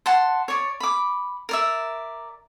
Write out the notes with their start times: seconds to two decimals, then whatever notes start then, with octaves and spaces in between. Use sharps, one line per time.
0.06 F#5 A5 C6
0.48 C#5 D5
0.80 B5 D6
1.49 A#4 D5 E5